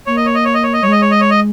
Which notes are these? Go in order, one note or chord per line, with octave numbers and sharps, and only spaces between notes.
A#3 C#5
D#5
C#5
D#5
C#5
D#5
C#5
D#5
G3 C#5
G#3 D#5
C#5
D#5
C#5
D#5